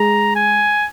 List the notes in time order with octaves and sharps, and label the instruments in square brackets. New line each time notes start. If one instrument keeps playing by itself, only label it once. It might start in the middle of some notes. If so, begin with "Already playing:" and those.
Already playing: [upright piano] G#3 [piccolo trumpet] A#5
[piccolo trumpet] G#5